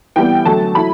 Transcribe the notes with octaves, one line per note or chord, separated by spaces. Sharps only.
E3 G3 B3 G5
D3 F#3 A3 A5
F#3 A3 E4 B5